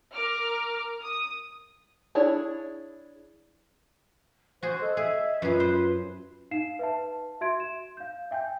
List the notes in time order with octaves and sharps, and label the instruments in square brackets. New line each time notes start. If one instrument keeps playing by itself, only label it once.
[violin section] A#4 D6 F6
D#6
[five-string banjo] D4 E4 G#4 C#5
[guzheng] F#4 G#4 [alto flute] C5
[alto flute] A4 [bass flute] D#5
[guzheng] G#4 [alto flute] E5
[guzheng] F#2 G#4 [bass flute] F4 [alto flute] B4
[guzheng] C5
[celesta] D#4 F5 C7 E7
B4 E5 A5
F#4 E5 C6 G#6 D7
E7
F5 G6
E5 G5 G#5 G6